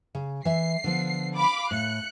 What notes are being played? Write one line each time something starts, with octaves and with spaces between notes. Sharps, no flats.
C#3
E3 E5 C7
D3 F3 B3
F5 B5 D6
A2 F#6 C#7